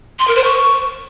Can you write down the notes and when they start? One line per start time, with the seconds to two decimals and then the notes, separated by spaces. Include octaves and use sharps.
0.19 C6
0.27 A#4
0.35 C5
0.44 C#6